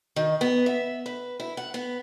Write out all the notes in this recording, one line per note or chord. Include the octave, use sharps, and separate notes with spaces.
D#3
B3
E5
B4
E4
F#5
B3